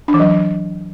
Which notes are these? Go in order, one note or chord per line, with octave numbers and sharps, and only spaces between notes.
D4
E3
F#3